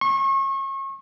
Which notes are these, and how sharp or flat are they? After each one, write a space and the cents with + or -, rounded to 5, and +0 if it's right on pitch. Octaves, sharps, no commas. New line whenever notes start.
C#6 -35